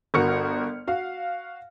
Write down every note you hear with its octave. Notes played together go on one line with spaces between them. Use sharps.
G1 F#4 A#4 C#6 F6 C#7
F#4 F5